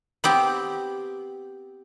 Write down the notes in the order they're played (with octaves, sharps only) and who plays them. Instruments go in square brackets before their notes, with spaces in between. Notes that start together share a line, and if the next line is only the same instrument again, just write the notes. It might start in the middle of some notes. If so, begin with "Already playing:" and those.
[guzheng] B3 C4 G4